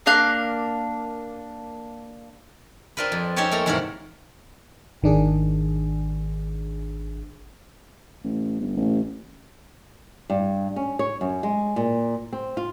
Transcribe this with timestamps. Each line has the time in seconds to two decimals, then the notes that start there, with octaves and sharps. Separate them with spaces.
0.06 A#3 D4 F5 F#6
2.97 C4 D4 F4 A#4 B4
3.12 F2
3.36 C4 C#4 D#4 G4 C#5 A5
3.51 A3 A#3 A4 A#5
3.66 E2 G#2 C3 G4 A#4 F#5
5.02 G#1 D#3 D4 G#4
8.24 A1
8.60 G1
8.77 A1
10.30 G2
10.76 C#4
10.99 C#5
11.21 F#2
11.43 G#3
11.76 A#2
12.33 C4
12.57 F4